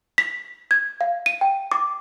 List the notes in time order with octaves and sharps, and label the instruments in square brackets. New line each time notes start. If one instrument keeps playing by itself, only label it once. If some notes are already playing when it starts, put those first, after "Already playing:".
[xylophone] B6
G#6
F5
D#7
G5
D6